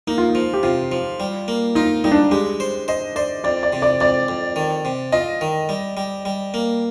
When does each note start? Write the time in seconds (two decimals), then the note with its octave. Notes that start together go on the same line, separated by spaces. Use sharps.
0.07 A#3 D#4
0.18 F4
0.29 D#4
0.35 F3
0.53 G4
0.63 C3 F4
0.92 F3
1.20 G3
1.48 A#3
1.75 D#4 F4
2.04 G3 D#4
2.11 D4
2.19 D#4
2.31 G#3 G4
2.60 C5
2.88 C5 D#5
3.16 C5 D5
3.44 F2 D5
3.63 D5
3.73 C3
3.82 D5
4.00 F2 D5
4.28 F2
4.56 D#3
4.85 C3
5.12 F4 D#5
5.41 D#3
5.69 G3
5.97 G3
6.25 G3
6.54 A#3